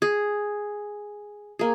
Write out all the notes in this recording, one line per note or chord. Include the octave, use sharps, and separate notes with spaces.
G#4
A#3 G#4